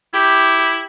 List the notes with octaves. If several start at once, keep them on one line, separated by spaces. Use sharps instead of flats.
E4 G4